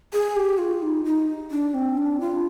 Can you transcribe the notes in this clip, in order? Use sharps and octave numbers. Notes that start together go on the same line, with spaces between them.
G#4
G4
F4
D#4
D#4
D4
C4
D4
F4